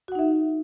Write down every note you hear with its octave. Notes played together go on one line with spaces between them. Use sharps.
D#4 F#4 E5 F#5